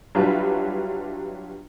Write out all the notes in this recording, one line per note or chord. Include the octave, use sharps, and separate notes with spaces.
F#3 G3 D4 E4 F4 B4